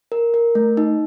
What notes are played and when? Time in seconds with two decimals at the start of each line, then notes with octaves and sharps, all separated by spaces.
0.12 A#4
0.34 A#4
0.55 A3
0.77 D#4